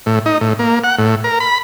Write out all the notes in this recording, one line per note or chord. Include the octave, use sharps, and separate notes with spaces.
A2
D#4
A2
A#3
F#5
A2
A#4
B5